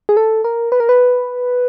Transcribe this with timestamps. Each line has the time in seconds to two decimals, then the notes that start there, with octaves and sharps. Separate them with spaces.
0.09 G#4
0.17 A4
0.44 A#4
0.72 B4
0.80 A#4
0.89 B4